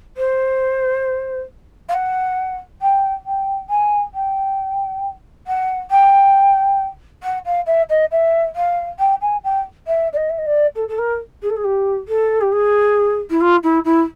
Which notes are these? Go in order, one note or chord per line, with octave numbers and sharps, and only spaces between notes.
C5
F5
F#5
G5
G5
G#5
G5
F#5
G5
F#5
F5
E5
D#5
E5
F5
G5
G#5
G5
E5
D5
D#5
E5
D#5
D5
A4
A4
A#4
G#4
A4
G#4
G4
A4
G4
G#4
E4
F4
E4
E4